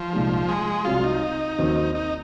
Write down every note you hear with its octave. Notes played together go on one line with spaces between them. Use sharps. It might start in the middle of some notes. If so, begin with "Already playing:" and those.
Already playing: F3
C2 A#2 G#3 D#4
G#3
C2 C3 F#3 F4
D#4
D#2 D#3 F#3 C4
D#4